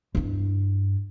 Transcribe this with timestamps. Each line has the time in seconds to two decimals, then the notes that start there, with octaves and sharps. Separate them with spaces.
0.15 G2 E4